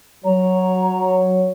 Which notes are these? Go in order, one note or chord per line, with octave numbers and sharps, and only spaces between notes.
F#3 C#5 A#5